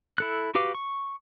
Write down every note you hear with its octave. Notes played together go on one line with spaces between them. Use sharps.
E4 A4 F#6
F#4 G4 B4 F5 D6
C#6